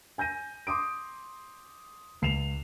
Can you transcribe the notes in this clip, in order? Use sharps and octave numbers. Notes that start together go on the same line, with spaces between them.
G#5 G6 A#6 D#7
C6 D6 D#6 D7
C#2 C7 E7 F7